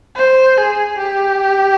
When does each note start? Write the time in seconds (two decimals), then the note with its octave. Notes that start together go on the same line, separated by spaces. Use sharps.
0.16 C5
0.58 G#4
0.99 G4